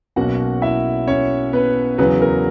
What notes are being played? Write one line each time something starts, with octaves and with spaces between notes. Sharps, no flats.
B1 B2 A#3 C#4 F#4 F#5
E4 E5
C#4 C#5
B3 B4
E2 C#3 F#3 B3 B4
A#4